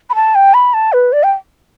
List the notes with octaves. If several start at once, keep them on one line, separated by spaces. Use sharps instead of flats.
B5
A5
G5
B5
A5
B4
D5
G5